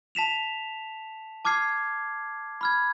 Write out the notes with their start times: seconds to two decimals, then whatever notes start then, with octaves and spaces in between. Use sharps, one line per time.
0.15 A5 B6 E7 F7
1.45 A5 D6 F6 G#6 C7
2.61 B5 F6 G#6